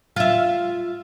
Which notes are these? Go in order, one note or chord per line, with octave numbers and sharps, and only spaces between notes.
F4 E5